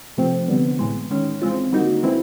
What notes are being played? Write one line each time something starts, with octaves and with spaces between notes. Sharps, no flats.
C3 F3 A3 C4
D3 G3 B3
A2 E3 G#3
D#3 G#3 C#4
E3 G#3 C4 F4
D3 G3 A#3 D#4 F#4
E3 G#3 C4 E4